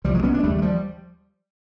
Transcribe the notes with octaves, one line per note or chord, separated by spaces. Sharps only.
C2 C3 F3 G3
F#3 G#3
B3 C#4
C4 D4
G#3
D#2 C#3 G3 A3
G#3
F3 G3